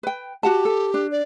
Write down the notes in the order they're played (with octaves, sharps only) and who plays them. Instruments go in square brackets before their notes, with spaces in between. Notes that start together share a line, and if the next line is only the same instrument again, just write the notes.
[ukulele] B4 G5
[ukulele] F#4 F#5 A5 [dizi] G4
[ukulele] A4
D4
[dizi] D5